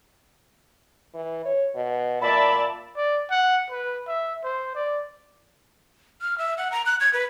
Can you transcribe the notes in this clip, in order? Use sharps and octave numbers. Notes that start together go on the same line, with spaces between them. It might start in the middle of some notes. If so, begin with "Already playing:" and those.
E3
C#5
B2
A#2 D5 E5 A5 B5
D5
F#5
B4
E5
C5
D5
F6
E5
F#5
A#5
F#6
G#6
B4